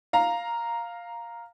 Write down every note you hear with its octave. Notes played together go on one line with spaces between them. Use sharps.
F5 A#5